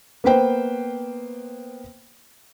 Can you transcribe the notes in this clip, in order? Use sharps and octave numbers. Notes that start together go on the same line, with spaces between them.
A#3 B3 B4 C5 G5